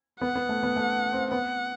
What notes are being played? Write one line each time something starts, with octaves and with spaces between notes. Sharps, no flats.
B3 F#5
B3
A3
B3
A3
C4
B3 F#5